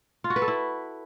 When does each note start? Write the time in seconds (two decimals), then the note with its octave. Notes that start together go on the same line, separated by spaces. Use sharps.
0.24 F4
0.30 F#4
0.36 B4
0.42 A4
0.48 E4